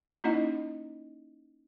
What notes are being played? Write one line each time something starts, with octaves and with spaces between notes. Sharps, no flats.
A#3 C#4 D#4 E4 D#5 F#5